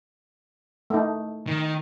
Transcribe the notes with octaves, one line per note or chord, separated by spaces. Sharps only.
A3 D#4
D#3